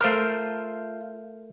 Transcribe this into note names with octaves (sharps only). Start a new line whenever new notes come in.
A3 F4 A#4 C5 F6